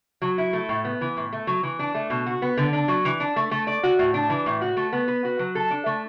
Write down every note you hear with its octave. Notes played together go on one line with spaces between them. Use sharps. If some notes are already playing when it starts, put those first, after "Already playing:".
F#3
E4
A3
A2
B3
E3
A2
A3
F#3
E3
D4
A3
B2
F#4
B3
D3
D4
F#3
E3
D4
A3
A3
D5
F#4
A2
D4
E3
A2
F#4
A3
B3
B4
F#4
F#3
A4
D4
A3